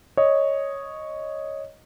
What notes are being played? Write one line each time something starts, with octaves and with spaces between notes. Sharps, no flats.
C#5 D#5